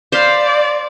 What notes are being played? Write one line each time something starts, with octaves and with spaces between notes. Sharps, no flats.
C5 D5 F5 B5